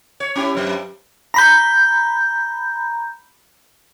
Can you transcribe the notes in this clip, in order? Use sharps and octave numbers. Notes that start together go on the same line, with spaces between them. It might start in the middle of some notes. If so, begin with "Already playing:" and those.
C#5
C#4 E4 G4
G2 F#3 C5
A#5 B5 G6